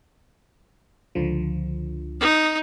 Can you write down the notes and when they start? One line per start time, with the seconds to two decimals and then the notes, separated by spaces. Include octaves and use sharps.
1.15 C#2 D3 F3
2.20 D#4